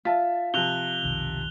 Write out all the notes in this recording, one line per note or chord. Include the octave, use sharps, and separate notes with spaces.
F4 E5 A5 B6
C3 F3 F#6 F7 G7
F1 B1 D#3